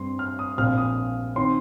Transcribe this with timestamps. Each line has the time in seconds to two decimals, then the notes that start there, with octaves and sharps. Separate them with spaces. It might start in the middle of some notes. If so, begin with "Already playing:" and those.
Already playing: G2 G3 C4 C6
0.19 F6
0.39 D#6
0.58 A#1 A#2 F3 C4 F6
0.78 D#6
1.36 D#3 C4 C6